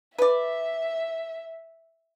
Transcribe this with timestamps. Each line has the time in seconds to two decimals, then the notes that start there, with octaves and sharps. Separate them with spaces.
0.18 B4 D5 E5